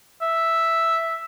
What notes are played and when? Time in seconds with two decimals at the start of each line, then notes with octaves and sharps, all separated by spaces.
0.22 E5